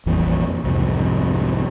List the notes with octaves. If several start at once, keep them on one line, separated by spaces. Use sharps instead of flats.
A#1 F2 A#2 E3
C2 F2 G#2